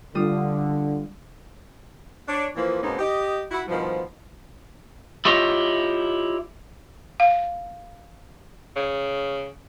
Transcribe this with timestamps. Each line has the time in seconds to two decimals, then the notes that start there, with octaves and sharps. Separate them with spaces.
0.15 D3 G3 F4 D#6
2.29 D4 C#5
2.56 E3 F3 A#3
2.82 G#2 B2 A#3 C4 C#4 D#4
2.99 G4 D#5
3.51 E4 F#4
3.68 G2 B2 D#3 F3
5.25 E4 F4 G4 C#5 D#5 E5
7.20 F5
8.76 C#3